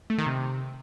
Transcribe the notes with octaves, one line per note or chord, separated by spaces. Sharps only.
A3
D#3
C3